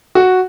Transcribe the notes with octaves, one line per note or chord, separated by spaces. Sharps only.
F#4